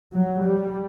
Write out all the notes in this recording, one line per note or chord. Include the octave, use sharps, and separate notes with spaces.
F#3
G3